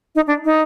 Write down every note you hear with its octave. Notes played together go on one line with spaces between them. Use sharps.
D#4
D4
D#4